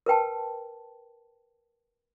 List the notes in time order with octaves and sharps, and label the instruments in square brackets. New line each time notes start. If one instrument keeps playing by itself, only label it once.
[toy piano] A#4 B4 G5 A5